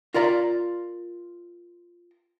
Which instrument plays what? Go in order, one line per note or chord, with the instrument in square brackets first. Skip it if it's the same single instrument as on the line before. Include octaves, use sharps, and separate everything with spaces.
[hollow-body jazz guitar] F4 A#4 D5 A#5